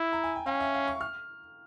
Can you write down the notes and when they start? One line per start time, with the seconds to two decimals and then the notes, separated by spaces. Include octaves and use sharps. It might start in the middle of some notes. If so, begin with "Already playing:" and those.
Already playing: E4
0.13 A#5
0.24 G#5
0.36 G5
0.46 C#4 F5
0.60 E5
0.74 F5
0.88 C#6
1.01 F6